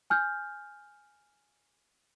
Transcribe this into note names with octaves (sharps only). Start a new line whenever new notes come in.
G#5 F6 G6